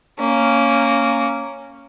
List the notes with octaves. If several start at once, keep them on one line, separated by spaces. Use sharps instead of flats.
A#3 C#4